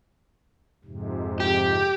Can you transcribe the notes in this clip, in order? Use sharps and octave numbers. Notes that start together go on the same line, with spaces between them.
F2 G#2 C3
G4